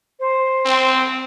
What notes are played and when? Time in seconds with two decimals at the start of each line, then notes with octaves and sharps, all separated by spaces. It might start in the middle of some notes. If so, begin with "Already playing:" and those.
0.20 C5
0.66 C4